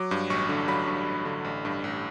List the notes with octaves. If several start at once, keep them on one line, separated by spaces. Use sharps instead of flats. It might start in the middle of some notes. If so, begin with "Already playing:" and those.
Already playing: F#3 D6
G2
A1 C#6
D3
F#3 B5
G2
A1
D3
A1
G2
A1